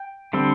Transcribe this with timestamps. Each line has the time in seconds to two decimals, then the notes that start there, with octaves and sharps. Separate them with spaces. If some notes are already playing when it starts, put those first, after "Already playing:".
Already playing: G5
0.33 D3 G3 C4